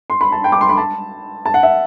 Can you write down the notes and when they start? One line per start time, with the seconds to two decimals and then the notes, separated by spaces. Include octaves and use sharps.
0.10 C6
0.21 B5
0.32 A5
0.44 G5
0.52 D6
0.61 C6
0.69 B5
0.77 A5
1.46 A5
1.54 F#5
1.63 E5